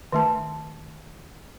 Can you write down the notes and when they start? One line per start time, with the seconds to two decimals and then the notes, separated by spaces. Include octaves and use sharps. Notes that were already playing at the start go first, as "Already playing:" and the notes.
0.12 D#3 A3 A5